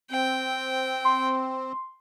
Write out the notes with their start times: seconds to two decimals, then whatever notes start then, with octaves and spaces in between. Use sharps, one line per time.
0.11 C4 G5
1.05 C6